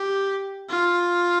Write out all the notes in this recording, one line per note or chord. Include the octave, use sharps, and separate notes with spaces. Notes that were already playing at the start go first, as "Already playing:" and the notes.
Already playing: G4
F4